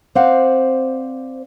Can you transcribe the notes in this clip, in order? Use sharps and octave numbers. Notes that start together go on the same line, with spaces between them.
C4 C5 D5 F5 F#5